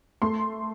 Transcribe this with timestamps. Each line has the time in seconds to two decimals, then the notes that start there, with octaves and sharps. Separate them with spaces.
0.22 A3 C6